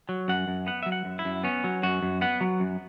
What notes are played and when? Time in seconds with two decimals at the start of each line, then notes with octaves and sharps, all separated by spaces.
0.09 F#3
0.28 F#2 F#5
0.48 F#2
0.67 B3 F#5
0.83 F#3 E5
0.92 F#5
1.05 F#2
1.19 E4
1.25 F#2
1.44 B3 C#4
1.64 F#3
1.83 F#2 F#4
2.03 F#2
2.21 B3 F#5
2.41 F#3
2.60 F#2